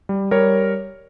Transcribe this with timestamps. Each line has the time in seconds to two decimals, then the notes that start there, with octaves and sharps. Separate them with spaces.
0.09 G3
0.31 G3 A#4 C#5